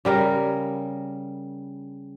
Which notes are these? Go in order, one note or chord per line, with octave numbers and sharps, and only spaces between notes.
C#3 G3 A#4